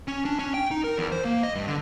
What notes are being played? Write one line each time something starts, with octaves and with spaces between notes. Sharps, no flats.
C#4
D4
C#4
G5
D#4
A#4
E2
C5
A#3
D#5
G2
D3